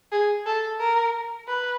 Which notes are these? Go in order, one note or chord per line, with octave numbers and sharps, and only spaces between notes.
G#4
A4
A#4
B4